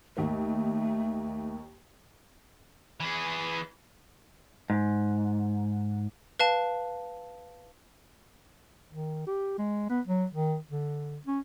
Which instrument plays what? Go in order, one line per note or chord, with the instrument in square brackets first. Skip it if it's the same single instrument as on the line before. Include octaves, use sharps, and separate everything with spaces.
[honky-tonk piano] D#2 A#3 [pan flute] A3
[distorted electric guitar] E3 G#4
[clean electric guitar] G#2
[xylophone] B4 F5 A5
[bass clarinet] D#3
G4
G#3
B3
F#3
D#3
D3
C#4